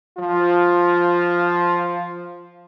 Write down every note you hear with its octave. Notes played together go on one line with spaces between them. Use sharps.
F3 F4